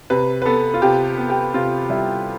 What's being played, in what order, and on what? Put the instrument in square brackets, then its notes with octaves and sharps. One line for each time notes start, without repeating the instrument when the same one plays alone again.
[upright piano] C3 B4
B4
B3 A4
F4
C3 G4
B3
G4
C3 F4
G3 E4